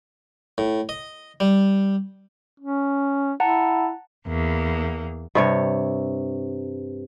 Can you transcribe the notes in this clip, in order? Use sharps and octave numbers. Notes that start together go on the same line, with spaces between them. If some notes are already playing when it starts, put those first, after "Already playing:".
A2
D#5
G3
C#4
E4 F#5 A5 A#5
E2 A#3
G2 C3 C#5